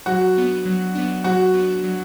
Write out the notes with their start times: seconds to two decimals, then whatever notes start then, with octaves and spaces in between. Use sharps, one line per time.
0.06 F#3 F#4
0.36 B3 D4
0.65 F#3
0.95 B3 D4
1.24 F#3 F#4
1.54 B3 D4
1.83 F#3